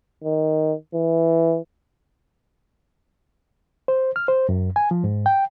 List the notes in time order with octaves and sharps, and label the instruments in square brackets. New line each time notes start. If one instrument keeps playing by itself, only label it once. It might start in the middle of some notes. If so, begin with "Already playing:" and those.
[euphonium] D#3
E3
[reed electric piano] C5
F6
C5
F#2
G#5
F3
G#2
G5